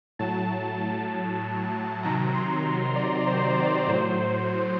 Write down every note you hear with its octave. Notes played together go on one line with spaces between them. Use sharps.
A2 F#3 A5
C3 D#3 F#3 A#5
C6
D5
C5
D5
A2 F#3 C5